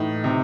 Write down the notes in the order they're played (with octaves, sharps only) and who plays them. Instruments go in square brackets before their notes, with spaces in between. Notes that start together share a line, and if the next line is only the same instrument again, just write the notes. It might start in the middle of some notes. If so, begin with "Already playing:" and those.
Already playing: [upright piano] A2 [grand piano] E3 D#4
[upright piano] C3 [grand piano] D#4